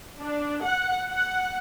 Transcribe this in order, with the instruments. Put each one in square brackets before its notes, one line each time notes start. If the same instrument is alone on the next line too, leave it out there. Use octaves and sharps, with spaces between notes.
[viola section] D4
F#5
F#5